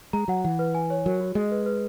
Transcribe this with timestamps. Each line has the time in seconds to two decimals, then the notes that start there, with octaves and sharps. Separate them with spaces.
0.13 G#3 A#5
0.28 F#3 F#5
0.44 E3 F#5
0.59 B4
0.75 G#5
0.90 C#5
1.06 F#3 A#4
1.21 F#4
1.35 G#3 D#5
1.51 B4
1.66 B4